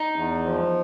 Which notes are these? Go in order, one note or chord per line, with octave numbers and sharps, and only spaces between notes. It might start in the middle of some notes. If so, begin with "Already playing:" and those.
Already playing: D#4
E2
F3